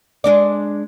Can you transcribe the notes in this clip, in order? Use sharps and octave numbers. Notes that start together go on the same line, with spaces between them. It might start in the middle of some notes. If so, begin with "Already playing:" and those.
G#3 D4 D5